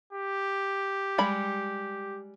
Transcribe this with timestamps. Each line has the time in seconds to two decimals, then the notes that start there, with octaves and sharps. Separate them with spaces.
0.13 G4
1.18 G3 G#3 B5